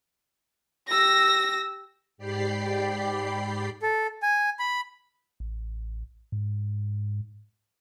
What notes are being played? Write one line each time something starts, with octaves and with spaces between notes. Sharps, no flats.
G4 E6 A#6
G#2 G4 D5 G5 B5 C7
A4
G#5
B5
A1
G#2